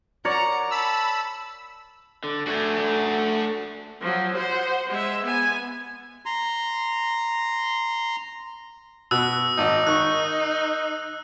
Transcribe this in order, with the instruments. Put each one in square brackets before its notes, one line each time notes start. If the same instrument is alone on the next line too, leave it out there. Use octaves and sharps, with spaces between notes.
[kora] A#4 C#5 D5 [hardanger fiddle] F#5 A#5
[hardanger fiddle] A5 [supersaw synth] B5 E6
[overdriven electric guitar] D3
[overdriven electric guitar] A3 D4 [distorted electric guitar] F#4 G#5
[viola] F3 F#3
C5 F#5
G#3 E5
B3 G#5
[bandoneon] A#5 C6
[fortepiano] B2 [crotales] E6 F#6
[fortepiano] G#1 [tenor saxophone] D#4
[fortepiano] D#3 C#6 [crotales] F#6